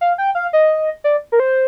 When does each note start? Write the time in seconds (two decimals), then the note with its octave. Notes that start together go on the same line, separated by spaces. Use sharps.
0.01 F5
0.18 G5
0.35 F5
0.53 D#5
1.04 D5
1.32 A#4
1.40 C5